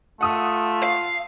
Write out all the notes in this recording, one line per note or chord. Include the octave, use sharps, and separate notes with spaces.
A3 F4 F#5 D#6 E6
F5